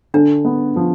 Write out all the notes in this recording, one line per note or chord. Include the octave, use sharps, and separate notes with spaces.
D3 D4
B3
F3